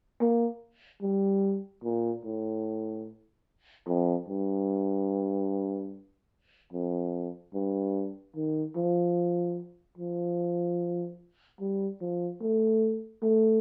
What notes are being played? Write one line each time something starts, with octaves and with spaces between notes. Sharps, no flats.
A#3
G3
A#2
A2
F2
G2
F2
G2
D#3
F3
F3
G3
F3
A3
A3